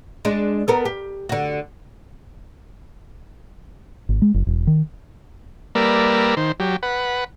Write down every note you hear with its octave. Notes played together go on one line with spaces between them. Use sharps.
G#3 D4
B3 A4 A#4
G4
D3 F#4
G#1
G#3
F#1
E1
D#3
G3 A#3 A#4 B4 D5 E6
D#3 C5
F#3 G4
B4 F#5